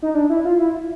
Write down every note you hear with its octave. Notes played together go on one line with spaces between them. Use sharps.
D#4
D4
E4
F4
E4